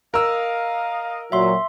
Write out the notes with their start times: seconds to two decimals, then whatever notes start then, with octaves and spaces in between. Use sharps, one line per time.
0.14 A#4 D#5 F5 E6
1.32 A#2 F#3 E5 C6